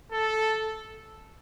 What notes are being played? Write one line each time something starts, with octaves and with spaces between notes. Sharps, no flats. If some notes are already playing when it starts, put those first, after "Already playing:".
A4